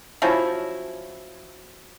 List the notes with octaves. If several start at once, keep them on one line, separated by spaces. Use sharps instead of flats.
F3 F#3 C#4 E4